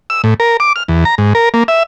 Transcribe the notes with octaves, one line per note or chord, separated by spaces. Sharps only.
E6
A2
A#4
D6
F6
E2
A#5
G#2
A#4
A#3
E5